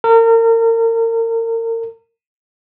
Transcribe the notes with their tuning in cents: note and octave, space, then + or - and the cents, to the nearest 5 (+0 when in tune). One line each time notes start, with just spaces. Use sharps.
A#4 -35